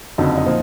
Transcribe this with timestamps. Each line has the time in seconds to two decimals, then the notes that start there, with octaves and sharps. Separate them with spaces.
0.18 F#1 F2 D3 F#3 D#4
0.38 D#4
0.46 A#2 F3